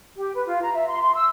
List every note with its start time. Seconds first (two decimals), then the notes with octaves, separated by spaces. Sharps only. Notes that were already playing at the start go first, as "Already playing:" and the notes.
0.16 G4
0.34 B4
0.46 F4
0.62 A#5
0.73 E5
0.87 C6
1.00 C6
1.14 E6